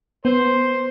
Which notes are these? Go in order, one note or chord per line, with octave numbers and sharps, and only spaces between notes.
B3 C5